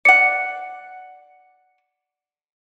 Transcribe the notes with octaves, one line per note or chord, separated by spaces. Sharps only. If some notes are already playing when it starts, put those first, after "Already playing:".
D5 F#5 C#7